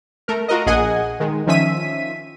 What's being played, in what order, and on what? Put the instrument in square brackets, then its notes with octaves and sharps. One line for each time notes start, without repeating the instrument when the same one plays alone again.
[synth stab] A3 A#4
F4 F#4 A#4 D#5
A#1 G#4 D#5 F#5 G#5
D#3 G#3
D#3 F3 C#4 E5 B6 D#7